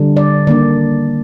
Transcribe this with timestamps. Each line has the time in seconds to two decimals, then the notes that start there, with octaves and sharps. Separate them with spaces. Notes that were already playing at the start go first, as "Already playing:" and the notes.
Already playing: D3 G3 D4
0.17 D5
0.47 D#3 A#3 D4 D5